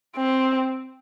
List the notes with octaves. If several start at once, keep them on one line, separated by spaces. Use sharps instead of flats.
C4